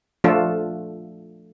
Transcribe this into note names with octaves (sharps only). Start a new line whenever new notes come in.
F3 A3 D4 F4 A4